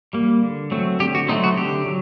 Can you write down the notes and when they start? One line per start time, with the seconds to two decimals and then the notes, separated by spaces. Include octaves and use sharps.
0.13 G3 A#3
0.43 D3
0.71 F#3 A3 C4
1.00 D3 G4
1.15 F#4
1.29 F#3 A3 C4 D#4
1.44 F#4
1.57 D3 G4
1.86 F#3